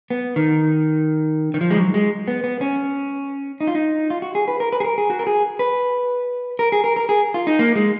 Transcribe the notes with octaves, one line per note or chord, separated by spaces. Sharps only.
B3
D#3
D#3
F3
G#3
F#3
G#3
B3
B3
C#4
D#4
F4
D#4
F4
F#4
G#4
B4
A#4
B4
G#4
A#4
G#4
F#4
A#4
G#4
B4
A#4
G#4
A#4
A#4
G#4
F4
D#4
A#3
G#3